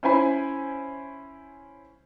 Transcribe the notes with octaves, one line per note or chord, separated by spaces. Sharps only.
C#4 E4 C5 G#5 B5